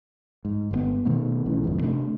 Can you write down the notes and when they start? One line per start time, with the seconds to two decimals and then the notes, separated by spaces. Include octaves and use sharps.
0.45 G#2
0.71 G1 A#2 B3
1.05 B2 D#3 A3 B3
1.46 B1 E3 C#4
1.63 G1 C2 F2 G#2
1.81 C3 A3 D4